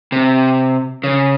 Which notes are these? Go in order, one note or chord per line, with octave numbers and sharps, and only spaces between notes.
C3
C#3